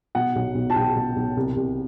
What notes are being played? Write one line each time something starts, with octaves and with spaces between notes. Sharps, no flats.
B2 F#5
B1
B1
A5
B1 G5
B2
B1
C2
C2